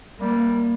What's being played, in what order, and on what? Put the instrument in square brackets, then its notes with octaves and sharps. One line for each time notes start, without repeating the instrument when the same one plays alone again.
[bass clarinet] G3 [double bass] A#3